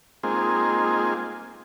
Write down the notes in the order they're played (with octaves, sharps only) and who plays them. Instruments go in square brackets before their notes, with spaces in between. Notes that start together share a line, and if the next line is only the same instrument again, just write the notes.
[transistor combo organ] G#3 A#3 C4 D#4 F4 G#4